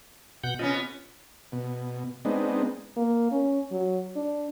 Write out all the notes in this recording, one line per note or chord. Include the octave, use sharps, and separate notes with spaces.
B2 F#5 G6
C3 B3 C#4 F4 D#5
B2
G#3 B3 C4 D4 D#4
A#3
C#4
F#3
D4